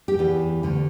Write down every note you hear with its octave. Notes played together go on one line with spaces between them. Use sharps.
G4
E2 E3
D2 D3